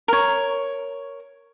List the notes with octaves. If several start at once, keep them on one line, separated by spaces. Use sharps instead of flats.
A#4 C#5